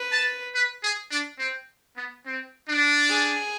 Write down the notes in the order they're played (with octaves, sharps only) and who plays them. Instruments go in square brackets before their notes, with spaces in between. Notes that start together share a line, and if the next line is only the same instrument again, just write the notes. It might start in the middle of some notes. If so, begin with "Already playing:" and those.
Already playing: [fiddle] B4
[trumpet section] A5
B4
G#4
D4
C4
B3
C4
D4
[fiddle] G#4